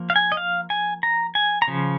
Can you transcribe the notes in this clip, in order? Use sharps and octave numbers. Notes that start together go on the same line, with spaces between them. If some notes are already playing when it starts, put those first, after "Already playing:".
Already playing: F3 A#3
F5
G#5
D#5
F5
G#5
A#5
G#5
A#5
C#3 F3